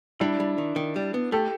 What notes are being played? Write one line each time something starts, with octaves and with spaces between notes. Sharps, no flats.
G3 D4 E4
G3
D#3
D#3
G3
B3
A3 G4 A4